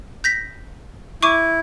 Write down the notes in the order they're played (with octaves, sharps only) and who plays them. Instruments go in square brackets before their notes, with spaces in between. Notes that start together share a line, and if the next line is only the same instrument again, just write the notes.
[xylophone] G6 A#6 B6
[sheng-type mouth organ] E4 [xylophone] C#6 D6 D#7